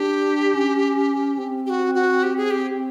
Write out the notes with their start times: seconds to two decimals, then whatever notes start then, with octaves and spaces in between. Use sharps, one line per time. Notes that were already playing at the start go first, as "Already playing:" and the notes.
Already playing: D4 G4
0.55 C#4
1.38 C4
1.66 G4
1.69 F#4
1.94 F#4
2.23 G4
2.37 G#4
2.50 G4